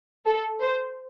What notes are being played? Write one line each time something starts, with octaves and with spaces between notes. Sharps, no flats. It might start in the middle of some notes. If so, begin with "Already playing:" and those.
A4
C5